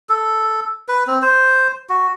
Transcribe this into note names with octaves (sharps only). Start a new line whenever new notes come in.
A4
B4
C4
C5
F#4